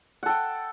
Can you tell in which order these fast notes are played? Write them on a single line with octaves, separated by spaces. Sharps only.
F#5 A4 G5